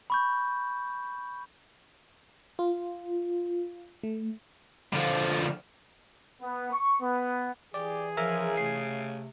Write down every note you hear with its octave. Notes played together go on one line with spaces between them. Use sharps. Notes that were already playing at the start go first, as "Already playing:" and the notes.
B5 C#6 G6
F4
A3
D3 F3
B3
C#6
B3
E3 G4 G#4 D5
C#3 F3 A#4 E5 A#5
C3 A3 C7